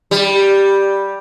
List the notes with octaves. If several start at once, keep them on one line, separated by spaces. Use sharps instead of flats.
G3